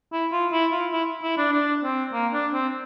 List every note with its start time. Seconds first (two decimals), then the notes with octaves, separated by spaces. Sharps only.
0.12 E4
0.32 F4
0.52 E4
0.72 F4
0.93 E4
1.23 E4
1.38 D4
1.53 D4
1.84 C4
2.13 A#3
2.33 D4
2.53 C4